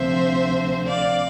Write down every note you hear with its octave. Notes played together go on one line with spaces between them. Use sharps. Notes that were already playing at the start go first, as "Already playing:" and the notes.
Already playing: D2 C3 F3 C4 C5 E5
D5 F5